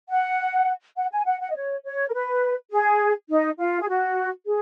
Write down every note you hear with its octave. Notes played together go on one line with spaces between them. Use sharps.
F#5
F#5
G#5
F#5
F#5
D#5
C#5
C#5
A#4
B4
G#4
D#4
F4
G#4
F#4
G#4